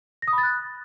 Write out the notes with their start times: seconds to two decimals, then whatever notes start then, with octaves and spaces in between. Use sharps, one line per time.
0.22 A#6
0.28 D#6
0.33 B5
0.38 A6
0.43 F#6